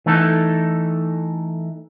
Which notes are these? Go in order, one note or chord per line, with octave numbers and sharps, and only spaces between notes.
E3 A3 D#4 A4